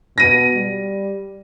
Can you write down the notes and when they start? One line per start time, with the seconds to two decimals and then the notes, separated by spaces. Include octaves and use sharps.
0.18 B2 A#6 D#7
0.55 G3